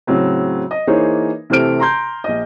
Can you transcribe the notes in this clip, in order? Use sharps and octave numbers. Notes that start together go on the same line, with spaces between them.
A2 C#3 F#3 C4
D#5
E3 A#3 D#4 G#4 C5 C#5
C3 E3 A3 C5 F6 D7
A#5 C6 G6
A#1 D#5